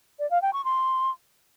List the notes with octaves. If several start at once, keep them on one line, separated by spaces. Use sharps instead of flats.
D5
F5
G5
C#6
C6